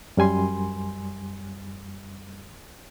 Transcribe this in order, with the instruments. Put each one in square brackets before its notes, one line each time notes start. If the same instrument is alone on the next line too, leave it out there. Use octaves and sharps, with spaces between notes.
[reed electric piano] F#2 G3 G#5 C6